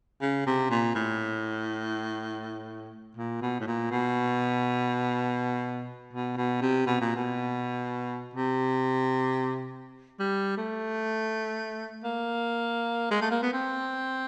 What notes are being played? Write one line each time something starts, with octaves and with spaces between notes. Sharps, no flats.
C#3
C3
A#2
A2
A#2
B2
A2
A#2
B2
B2
B2
C3
B2
A#2
B2
C3
G3
A3
A#3
G#3
A3
A#3
B3
C4